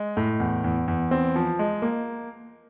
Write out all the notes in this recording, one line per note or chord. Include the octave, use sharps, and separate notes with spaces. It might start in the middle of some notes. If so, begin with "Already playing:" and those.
Already playing: G#3
A2
E2
E2
E2
C4
F3
G#3
A#3